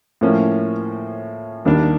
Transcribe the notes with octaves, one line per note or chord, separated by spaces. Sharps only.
A2 F3 A#3 C#4
D#2 D#3 G3 A#3 D4